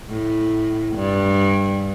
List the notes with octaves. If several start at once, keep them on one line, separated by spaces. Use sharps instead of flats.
A2
G2